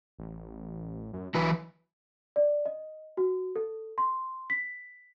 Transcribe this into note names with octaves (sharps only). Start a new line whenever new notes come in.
A1
F#2
G1 E3 F#3 B4
D5
D#5
F#4
A4
C6
B6